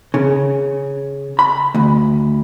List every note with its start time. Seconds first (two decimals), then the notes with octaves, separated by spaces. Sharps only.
0.14 C#3
1.39 B5
1.75 D2